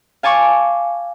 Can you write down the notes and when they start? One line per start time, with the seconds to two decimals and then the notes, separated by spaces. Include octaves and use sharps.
0.23 F5 G#5 A5 C#6 D6